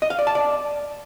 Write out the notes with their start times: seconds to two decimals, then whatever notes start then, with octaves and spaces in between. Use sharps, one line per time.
0.02 D#5
0.10 F5
0.19 D5
0.27 A5
0.35 D5